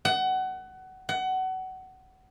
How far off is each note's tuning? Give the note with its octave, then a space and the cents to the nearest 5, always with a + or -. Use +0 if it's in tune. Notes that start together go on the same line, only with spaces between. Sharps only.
F#5 +25
F#5 +25